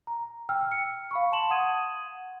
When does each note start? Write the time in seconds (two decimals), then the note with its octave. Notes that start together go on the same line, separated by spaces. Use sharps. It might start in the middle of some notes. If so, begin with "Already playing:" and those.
0.07 A#5
0.49 G5 E6 F6
0.72 C#7
1.11 F5 B5 C#6
1.32 A5 C6 E7 F#7
1.50 F#5 D#6 G#6 D#7